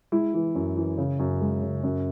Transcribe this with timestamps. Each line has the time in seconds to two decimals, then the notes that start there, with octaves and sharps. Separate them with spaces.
0.12 G#3 E4
0.34 E3
0.55 F#2
0.77 E3
0.98 C#3
1.19 F#2
1.41 G#3
1.62 C#3
1.83 F#2